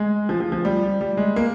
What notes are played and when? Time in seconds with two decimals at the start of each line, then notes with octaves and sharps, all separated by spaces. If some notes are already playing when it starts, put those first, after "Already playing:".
Already playing: G#3
0.29 F3
0.40 F3
0.52 F3
0.65 G3
1.01 G3
1.17 G#3
1.36 A#3